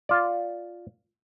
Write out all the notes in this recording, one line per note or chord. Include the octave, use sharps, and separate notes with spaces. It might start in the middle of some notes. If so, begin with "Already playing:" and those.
F4 D5